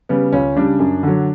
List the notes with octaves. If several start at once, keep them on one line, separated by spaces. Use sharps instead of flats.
C#3 G3 B3
C#2 C#4
C#3 G3 D4
F#2
D3 F#3